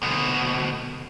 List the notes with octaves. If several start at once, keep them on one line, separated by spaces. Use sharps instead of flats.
D2 B2